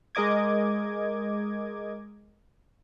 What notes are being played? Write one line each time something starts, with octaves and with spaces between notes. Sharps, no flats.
G#3 A#4 D#5 D6 G#6